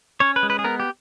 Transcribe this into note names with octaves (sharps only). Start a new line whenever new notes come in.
C#4 C#5
B4
G#3
B4
G#4
B3 A#4
G4